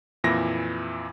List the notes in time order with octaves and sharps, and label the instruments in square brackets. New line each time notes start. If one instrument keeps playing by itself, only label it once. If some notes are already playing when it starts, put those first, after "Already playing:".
[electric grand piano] F2 A#2 E3 E4 A#6